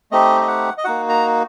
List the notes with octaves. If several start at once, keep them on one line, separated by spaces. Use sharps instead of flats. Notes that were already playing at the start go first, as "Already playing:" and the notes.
A3 C4 D#4 G4 D#5
D#5
F#5
D#5
A#3 D#4 F#4 F#5
A#5